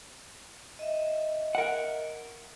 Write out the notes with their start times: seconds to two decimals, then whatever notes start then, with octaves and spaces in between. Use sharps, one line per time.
0.79 D#5 E5
1.55 A#4 F#5